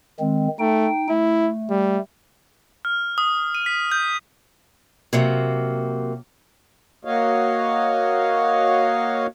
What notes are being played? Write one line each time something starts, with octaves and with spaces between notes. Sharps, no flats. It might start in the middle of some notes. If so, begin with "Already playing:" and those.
D#3 G#3 C4
A3 D#4 G5
A3 E4
G3
F6
D#6
D#7
B6
G6
C3 F#3 A#3
A#3 F#4 C#5 D#5 F5